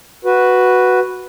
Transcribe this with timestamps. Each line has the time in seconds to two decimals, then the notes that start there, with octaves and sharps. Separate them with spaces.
0.25 F#4 B4